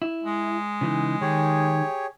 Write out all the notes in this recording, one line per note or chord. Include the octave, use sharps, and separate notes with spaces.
E4
G#3
C#3 E3 D#4
D#3 G4 G#4 C#5